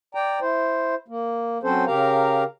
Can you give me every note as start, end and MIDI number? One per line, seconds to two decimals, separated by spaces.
0.15 0.39 74
0.15 0.39 79
0.15 0.39 82
0.41 0.95 64
0.41 0.95 72
1.08 1.58 58
1.63 1.85 54
1.63 1.85 60
1.63 1.85 61
1.63 1.85 69
1.63 1.85 72
1.87 2.44 49
1.87 2.44 67
1.87 2.44 70
1.87 2.44 77
1.87 2.44 82